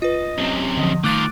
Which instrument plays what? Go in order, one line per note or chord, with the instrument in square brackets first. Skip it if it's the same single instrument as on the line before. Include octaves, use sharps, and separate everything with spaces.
[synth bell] F4 B4 [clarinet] D#5
[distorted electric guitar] F#2 C3
[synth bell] D3 F3 [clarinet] D#5
[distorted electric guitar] D#3 F4 [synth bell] A3 F#6 A6 [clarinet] D6